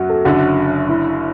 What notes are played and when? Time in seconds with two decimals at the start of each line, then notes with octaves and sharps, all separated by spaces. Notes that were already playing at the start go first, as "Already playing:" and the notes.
Already playing: F#2 F#3 F#4
0.09 A4
0.25 F#1 F#2 D3 F#4
0.89 E4